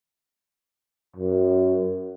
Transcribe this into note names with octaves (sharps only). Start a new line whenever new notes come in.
F#2